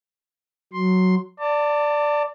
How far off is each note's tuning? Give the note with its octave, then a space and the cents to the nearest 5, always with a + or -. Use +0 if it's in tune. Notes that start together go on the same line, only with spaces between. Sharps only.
F#3 +0 C6 +5
D5 +0 A5 +30